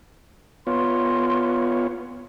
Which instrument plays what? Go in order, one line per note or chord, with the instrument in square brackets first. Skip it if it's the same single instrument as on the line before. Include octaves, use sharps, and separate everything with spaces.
[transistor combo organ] B3 F4 C#5 [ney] C6